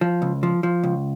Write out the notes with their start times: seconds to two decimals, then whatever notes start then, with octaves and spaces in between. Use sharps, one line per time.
0.01 F3
0.22 C#2
0.43 F3
0.63 F3
0.83 C#2